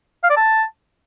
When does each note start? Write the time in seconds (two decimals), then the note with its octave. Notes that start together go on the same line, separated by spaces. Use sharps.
0.23 F5
0.30 D5
0.36 A5